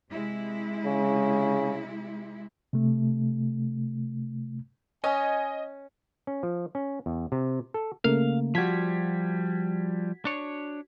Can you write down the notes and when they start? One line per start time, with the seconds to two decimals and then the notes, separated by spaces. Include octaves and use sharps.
0.11 C3 G#3 E4
0.86 C#3
2.73 C3 A3
5.04 C#4 D#5 G#5
6.27 C#4
6.43 F3
6.75 C#4
7.06 E2
7.32 C3
7.74 A4
8.04 C#3 A3 A#3 F5
8.55 F3 G3 F#4 G#6 B6
10.25 D4 C#5